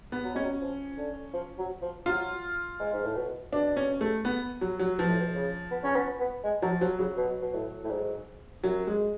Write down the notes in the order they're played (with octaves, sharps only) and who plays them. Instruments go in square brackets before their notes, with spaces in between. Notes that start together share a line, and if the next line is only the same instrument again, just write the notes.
[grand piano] B3
[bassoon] F#3
[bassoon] G#3 [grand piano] C#4
[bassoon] F#3
F3
D3
F3
F#3
F3
[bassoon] F#3 [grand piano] F4
[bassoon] G#3
G#2
A2
B2
[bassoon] B2 [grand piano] D4
[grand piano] C#4
A3
B3
F#3
F#3
[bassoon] B2 [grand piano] F3
[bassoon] A2
B2
C#3
B3
C#4
B3
B3
G#3
[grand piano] F3 [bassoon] F#3
[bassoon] F3 [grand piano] F#3
[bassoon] C#3 [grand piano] F#3
[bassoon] B2
B2
A2
A2
G#2
[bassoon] F#2 [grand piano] F#3
[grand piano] G#3